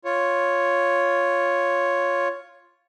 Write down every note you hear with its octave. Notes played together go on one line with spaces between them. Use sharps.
F4 C#5